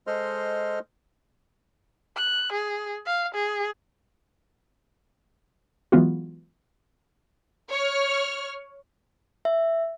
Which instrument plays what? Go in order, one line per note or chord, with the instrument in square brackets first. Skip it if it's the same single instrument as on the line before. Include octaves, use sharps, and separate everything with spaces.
[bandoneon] G#3 A4 C5 D#5 C6 F6
[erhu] F#6
G#4
F5
G#4
[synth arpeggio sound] E3 F#3 G#3 B3 F4 F#4
[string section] C#5 F6
[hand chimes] E5